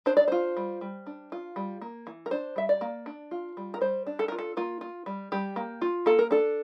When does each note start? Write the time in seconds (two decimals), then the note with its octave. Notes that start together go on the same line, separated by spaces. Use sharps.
0.06 D4 C5
0.17 D5
0.28 F4 C5
0.57 G3
0.81 G3
1.07 D4
1.32 F4
1.56 G3
1.82 A#3
2.07 E3
2.26 A#4
2.31 D4 C5
2.56 G3 E5
2.69 D5
2.81 A#3
3.06 D4
3.31 F4
3.57 G3
3.74 A#4
3.81 G3 C5
4.07 D4
4.19 A4
4.28 F4 A#4
4.39 A4
4.57 A#3 F4
4.81 F4
5.06 G3
5.32 G3 G4
5.56 A#3
5.82 F4
6.06 A#3 A4
6.19 A#4
6.31 D4 A4